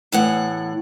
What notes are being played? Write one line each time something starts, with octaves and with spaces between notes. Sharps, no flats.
E2 A2 F#5